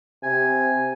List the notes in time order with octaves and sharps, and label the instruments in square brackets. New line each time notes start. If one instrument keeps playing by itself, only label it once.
[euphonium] C3 [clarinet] G#5